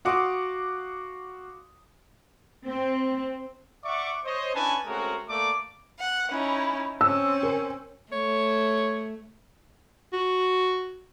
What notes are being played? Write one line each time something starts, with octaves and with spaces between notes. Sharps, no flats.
F#4 F5 F#5 C6 D6 D#6
C4
D5 E5 F#5 C#6 D6
C5 C#5 D#5
C#4 D4 E4 B4 G#5 A5
G#3 A3 C4 C#4 F#4 A#4
A3 A#3 D5 D6
F#5
C#4 D#4 E4
C4 C#4 E6
A#4
A3 C#5
F#4